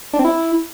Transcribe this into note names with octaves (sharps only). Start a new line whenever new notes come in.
D4
C4
E4